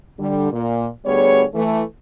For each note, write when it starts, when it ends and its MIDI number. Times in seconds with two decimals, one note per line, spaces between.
0.19 0.50 50
0.19 0.50 55
0.52 0.86 46
1.05 1.43 38
1.05 1.43 55
1.05 1.43 59
1.05 1.43 68
1.05 1.43 73
1.54 1.82 52
1.54 1.82 57